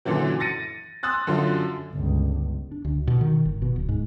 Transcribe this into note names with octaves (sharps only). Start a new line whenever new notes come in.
F#2 A#2 D3 E3 F#3
A6 A#6 C#7 D#7
C6 D#6 E6 F#6 A6
F#2 D3 F#3 F4
G1 C#2
D4
D2
B2
D#3
G1
B2
D1
G#2